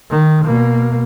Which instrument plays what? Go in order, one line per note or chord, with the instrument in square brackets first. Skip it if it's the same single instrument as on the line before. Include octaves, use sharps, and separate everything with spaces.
[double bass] D#3
B2 A#3